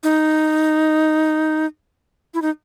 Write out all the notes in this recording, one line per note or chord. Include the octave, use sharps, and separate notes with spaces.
D#4
E4
D#4